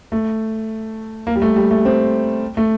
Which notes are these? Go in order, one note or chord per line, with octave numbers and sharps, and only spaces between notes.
A3
A#3
G3
A3
G3
A3
C4
A3